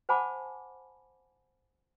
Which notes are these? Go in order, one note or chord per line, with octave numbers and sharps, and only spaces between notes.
C5 F#5 G#5 A5 B5 D6